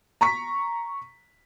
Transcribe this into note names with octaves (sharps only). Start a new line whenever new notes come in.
A#5 C#6 B6